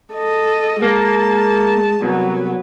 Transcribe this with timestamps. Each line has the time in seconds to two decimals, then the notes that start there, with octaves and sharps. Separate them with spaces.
0.14 A4 D#5
0.82 G#3 A#3 A5
2.02 C2 F#3 B3